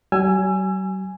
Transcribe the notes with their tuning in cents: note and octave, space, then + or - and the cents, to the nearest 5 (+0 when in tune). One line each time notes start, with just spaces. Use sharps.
F#3 +45 G#5 +0 E6 +30